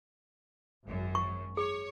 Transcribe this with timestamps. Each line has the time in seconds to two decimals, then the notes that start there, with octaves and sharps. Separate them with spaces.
0.84 G#1 F#2
1.15 C#6
1.57 G#4 C#5